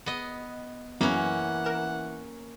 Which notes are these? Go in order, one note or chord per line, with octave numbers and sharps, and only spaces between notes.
B3 D#5
F#2 E3 A#3 B3 C#4 F#5
A#4 E7